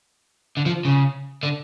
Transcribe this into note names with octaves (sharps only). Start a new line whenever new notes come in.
D3
F3
C#3
D3